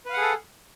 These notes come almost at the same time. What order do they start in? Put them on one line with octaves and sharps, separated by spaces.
B4 F5 F#5 G#4 A4